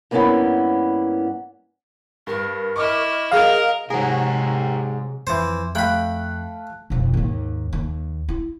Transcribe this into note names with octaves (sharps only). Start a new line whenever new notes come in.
G2 A#3 B3 C#4 E4 F#5
G2 A#4
E4 D#5 C#6 D6 F6
F#3 G#4 A#4 D#5 F5 D#6
G#2 C3 F#3 G4 G#4 A#4
F2 E3 C5
A3 F5 G5 B5 F#6
E1 F2
D#2 G#2
D#2
E4